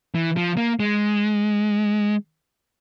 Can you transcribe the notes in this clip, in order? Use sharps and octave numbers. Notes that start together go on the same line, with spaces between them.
E3
F3
A#3
G#3